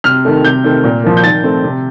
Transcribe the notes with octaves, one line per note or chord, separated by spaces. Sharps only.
C3 F6
D#3 A3
C3 G6
D#3 A3 C4
A#2
F3 A#3
G6
D#3 A6
A3 C4
C3